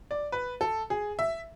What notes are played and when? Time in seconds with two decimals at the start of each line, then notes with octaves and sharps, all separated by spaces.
0.11 D5
0.32 B4
0.61 A4
0.90 G#4
1.19 E5